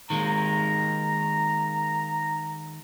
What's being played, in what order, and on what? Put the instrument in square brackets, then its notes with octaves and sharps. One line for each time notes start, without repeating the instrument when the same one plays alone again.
[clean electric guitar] D#3 G#3 A#3 [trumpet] A#5